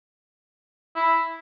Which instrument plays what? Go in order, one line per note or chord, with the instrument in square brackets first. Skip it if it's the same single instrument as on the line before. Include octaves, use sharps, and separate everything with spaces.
[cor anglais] E4